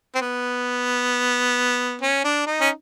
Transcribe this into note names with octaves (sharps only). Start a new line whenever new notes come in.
C4
B3
C#4
D4
D#4
C#4